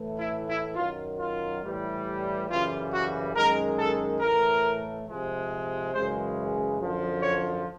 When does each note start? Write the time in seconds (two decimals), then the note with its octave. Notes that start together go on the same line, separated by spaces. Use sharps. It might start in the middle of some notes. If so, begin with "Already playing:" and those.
Already playing: A2 E3 A3
0.18 E4
0.47 E4
0.75 F#2 D#3 F#3 F4
1.19 F4
1.62 A2 E3 G3
2.48 F#2 C#3 E3 G3 F4
2.91 F#4
3.34 F#2 D#3 G#3 A#4
3.77 A4
4.20 A2 E3 A3 A#4
5.07 C3 F3 G#3
5.93 F#2 C#3 E3 G#3 C5
6.79 F#2 D3 F3
7.22 C#5